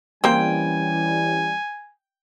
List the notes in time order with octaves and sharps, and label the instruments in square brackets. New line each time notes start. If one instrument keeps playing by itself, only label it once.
[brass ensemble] E3 G3 C#4 [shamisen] A#3 C4 [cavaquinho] G5 [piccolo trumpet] G#5